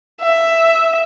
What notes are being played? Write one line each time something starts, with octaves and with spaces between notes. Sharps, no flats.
E5